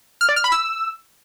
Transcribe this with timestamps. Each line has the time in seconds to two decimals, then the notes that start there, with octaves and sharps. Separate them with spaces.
0.21 F6
0.29 D5
0.36 F6
0.44 B5
0.52 E6